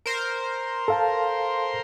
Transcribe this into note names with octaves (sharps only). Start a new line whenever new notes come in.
A#4 C5
A4 F5 A5